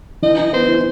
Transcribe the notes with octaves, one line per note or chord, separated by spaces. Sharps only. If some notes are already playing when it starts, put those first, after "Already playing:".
E3 D#5
E4
B3 C5
E4